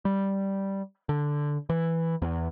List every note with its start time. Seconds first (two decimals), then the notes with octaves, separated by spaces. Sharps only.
0.05 G3
1.09 D3
1.70 E3
2.22 E2